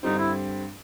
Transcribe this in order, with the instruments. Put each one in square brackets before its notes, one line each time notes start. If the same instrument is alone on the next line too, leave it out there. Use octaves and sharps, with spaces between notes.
[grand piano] G2 D3 G3 C4 [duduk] D#4
[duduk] E4